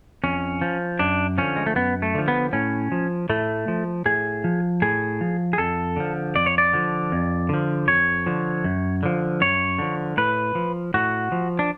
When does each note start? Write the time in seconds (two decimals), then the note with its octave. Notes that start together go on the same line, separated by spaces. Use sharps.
0.24 F2 C#4
0.62 F3
0.99 F#2 D4
1.38 D3 F3 C#4
1.56 G#3
1.66 A3
1.76 F#2 B3
2.02 A3
2.15 D3 F3
2.28 B3
2.53 A2 C#4
2.92 F3
3.29 A2 A3
3.68 F3
4.06 A2 G#4
4.44 F3
4.82 A2 G#4
5.21 F3
5.53 G#4
5.58 F2 A4
5.96 D3 F3
6.36 F2 D5
6.46 C#5
6.58 D5
6.73 D3 F3
7.12 F2
7.49 D3 F3
7.88 F2 C#5
8.26 D3 F3
8.64 F#2
9.03 D3 F3
9.41 F#2 C#5
9.79 D3 F3
10.17 A2 B4
10.55 F3
10.94 A2 F#4
11.32 F3
11.59 D4